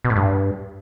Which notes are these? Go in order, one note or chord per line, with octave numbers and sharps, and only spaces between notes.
B2
A2
G2